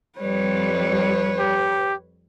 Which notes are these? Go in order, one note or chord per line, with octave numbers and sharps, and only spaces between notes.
F2 G3 B4 C#5
G4